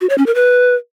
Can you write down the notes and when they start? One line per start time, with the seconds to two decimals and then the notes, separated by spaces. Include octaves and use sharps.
0.01 F#4
0.09 C#5
0.18 C#4
0.26 A#4
0.35 B4